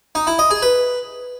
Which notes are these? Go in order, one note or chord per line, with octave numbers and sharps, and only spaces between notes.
D#4
E4
D#5
G#4
B4